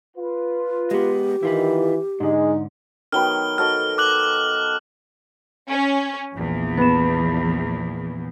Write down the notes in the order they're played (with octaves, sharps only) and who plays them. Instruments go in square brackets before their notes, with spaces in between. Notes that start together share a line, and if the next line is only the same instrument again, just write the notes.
[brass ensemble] F4 B4
[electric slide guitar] G#3 B3 [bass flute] G4
[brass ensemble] D#3 [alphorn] E3 [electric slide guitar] E4 F4 B4
[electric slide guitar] G#2 D3 [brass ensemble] G#3 [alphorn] D#4
[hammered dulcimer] D#3 F#3 B3 [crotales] F6 G7
[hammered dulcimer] F#4 A4 D#5 [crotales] F6
[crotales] D6 F#6 F#7
[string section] C#4
A#1 E2
[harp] B3 E7